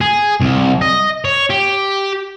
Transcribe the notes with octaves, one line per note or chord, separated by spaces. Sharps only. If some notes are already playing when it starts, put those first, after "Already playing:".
G#4
C2
D#5
C#5
G4